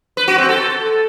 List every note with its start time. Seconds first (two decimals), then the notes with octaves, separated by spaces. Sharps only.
0.17 B4
0.28 F#4
0.38 C4
0.49 A4